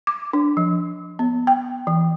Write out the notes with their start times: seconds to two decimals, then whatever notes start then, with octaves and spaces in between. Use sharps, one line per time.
0.07 D6
0.33 D4
0.57 F3
1.19 B3
1.47 G5
1.87 E3